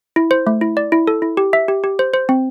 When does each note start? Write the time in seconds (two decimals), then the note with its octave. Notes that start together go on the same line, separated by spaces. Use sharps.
0.16 E4
0.31 C5
0.47 A3
0.61 E4
0.77 D5
0.92 E4
1.07 A4
1.22 E4
1.37 G4
1.53 E5
1.68 G4
1.84 G4
1.99 C5
2.14 C5
2.29 C4